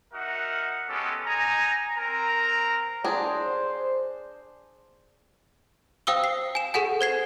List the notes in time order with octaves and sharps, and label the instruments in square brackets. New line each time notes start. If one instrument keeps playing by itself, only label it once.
[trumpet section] D#4 F#4 A#4 E5 F#5
G#3 B3 C#4 G4 A4
D#4 G#5 A#5
C4 A#4 A#5
[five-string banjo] D4 G#4 [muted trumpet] C5
[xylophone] C5 F5 G5 D#6 E6 G7
C7
G#5 E7
G#4 A4 F#5 G#5
C5 G#6 C7